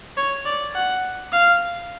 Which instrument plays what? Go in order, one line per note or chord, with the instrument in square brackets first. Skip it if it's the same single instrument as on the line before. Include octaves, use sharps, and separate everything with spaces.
[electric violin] C#5
D5
F#5
F5